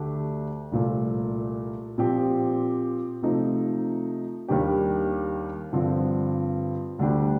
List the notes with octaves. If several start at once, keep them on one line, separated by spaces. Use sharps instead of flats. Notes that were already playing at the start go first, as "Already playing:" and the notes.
Already playing: D2 D3 A3 D4 G4
C2 A#2 F3 A3
A#2 F3 C4 G4
C3 F3 A3 D#4
D#2 D#3 G3 D4 G4
G2 D3 F3 C4
D2 D3 G3 D4 G4